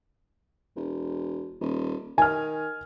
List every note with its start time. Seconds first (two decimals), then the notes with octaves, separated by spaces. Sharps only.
0.76 E1
1.60 D#1
2.18 D#3 G#5 F6